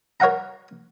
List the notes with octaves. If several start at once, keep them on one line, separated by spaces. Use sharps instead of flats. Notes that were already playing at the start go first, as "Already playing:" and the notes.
A#4 C#5 F5 F#5 A#5